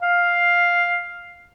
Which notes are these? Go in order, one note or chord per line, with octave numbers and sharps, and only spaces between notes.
F5